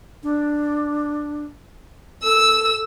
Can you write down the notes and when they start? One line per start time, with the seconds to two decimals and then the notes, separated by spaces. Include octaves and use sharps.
0.23 D4
2.23 A4 E6